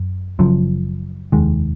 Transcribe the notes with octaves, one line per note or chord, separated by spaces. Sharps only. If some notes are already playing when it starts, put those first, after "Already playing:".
Already playing: F#2
F#1 F#2 F3
F1 D#2 D#3 G#3